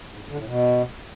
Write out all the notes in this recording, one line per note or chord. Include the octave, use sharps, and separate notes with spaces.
G#2
F#2
D3
A2
B2